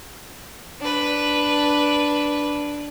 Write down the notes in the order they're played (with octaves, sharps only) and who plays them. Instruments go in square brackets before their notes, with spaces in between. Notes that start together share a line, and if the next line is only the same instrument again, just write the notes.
[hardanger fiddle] D4 B4